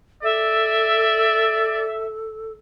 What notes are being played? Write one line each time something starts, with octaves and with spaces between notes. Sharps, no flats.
A4 D5 E5